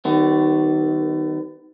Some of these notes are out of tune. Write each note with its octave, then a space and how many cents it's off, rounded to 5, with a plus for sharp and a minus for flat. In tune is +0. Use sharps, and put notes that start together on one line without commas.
D#3 +0 G3 -40 B3 +35